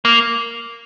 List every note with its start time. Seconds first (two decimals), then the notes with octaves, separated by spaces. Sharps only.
0.05 A#3